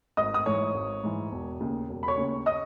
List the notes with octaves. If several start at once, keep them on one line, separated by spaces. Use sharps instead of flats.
G#1 D#5 D#6
D#6
G#2 E3 C#5 C#6
G#1
G#2 E3
E1
D#2 C#3
E1
B5
C#5 C#6
D#2 C#3
D#5 D#6